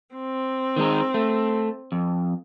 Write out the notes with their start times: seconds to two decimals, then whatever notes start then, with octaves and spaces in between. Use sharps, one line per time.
0.15 C4
0.76 D#3 G#3 D#4
1.14 A3
1.92 F2